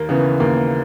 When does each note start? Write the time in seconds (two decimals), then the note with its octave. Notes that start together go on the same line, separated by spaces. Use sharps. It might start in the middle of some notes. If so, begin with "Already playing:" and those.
Already playing: D#2 A#3
0.09 C#3 E3 B3
0.40 D#2 A#3